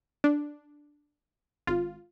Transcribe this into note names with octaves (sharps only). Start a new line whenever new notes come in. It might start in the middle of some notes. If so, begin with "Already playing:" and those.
D4
G#1 F4